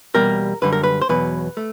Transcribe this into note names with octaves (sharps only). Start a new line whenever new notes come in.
E2 B2 G3 A#3 A#4
F#2 D3 G3 B4
A#4
B4
C5
E2 B2 F#3 B4
A3